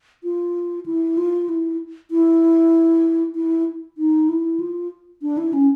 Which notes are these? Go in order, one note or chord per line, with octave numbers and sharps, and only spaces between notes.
F4
E4
F4
E4
E4
E4
D#4
E4
F4
D4
E4
C#4